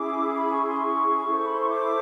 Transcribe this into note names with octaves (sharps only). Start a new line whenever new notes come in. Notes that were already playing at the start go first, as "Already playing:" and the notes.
Already playing: C#4 E4 G#4 D6
B5
C#6
C6
C#6
E4 A4 C5
B5
C6
C#6
D6